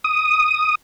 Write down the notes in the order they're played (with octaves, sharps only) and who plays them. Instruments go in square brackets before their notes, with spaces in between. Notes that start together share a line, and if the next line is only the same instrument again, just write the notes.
[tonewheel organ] D#6